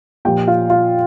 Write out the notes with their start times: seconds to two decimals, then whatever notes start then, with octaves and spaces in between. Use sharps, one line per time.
0.25 A#2 F3 G4 G5
0.47 F4 F5
0.70 F4 F5